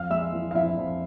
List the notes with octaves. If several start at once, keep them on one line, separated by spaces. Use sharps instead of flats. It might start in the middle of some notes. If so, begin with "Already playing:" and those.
Already playing: F2 F5 F6
G#3 E5 E6
E3
F5
F2 E4 E5
F2